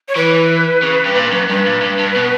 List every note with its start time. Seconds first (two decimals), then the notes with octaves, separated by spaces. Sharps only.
0.08 C#5
0.16 E3 B4
0.83 C#3
1.06 G2
1.15 A#2
1.32 F#2
1.49 G2 B4
1.66 A#2
1.82 G2
1.99 G2
2.16 B2